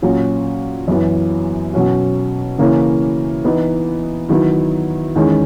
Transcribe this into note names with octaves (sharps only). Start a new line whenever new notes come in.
A#2 F#3 C#4 F#4
F#2 E3 B3
B2 F#3 C#4 F#4
C#3 E3 A#3 C#4 E4
E3 B3 D#4
D#3 F#3 B3 E4
E2 D#3 G#3 C#4